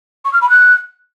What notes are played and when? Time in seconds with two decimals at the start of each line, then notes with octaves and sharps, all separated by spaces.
0.25 C#6
0.33 F6
0.41 B5
0.50 F#6